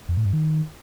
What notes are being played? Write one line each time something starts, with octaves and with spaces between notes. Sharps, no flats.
F2
A2
G2
D#3